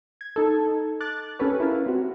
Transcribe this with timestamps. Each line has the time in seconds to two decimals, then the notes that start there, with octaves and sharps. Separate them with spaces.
0.21 G#6
0.36 D#4 A4
1.00 D6 F#6 A6
1.39 C#4 G4 A4 B4 C#5
1.60 E4 A#4 F5
1.86 C4 F#4